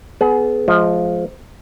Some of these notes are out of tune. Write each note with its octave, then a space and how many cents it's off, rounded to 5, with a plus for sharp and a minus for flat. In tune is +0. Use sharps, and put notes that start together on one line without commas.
B3 +15 G#4 +30
F3 +0 G#3 +30